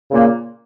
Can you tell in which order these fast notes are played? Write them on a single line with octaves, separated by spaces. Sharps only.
C#3 A#2 A#3